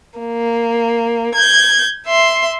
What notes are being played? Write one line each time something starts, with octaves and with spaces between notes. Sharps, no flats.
A#3
G6 G#6
E5 C6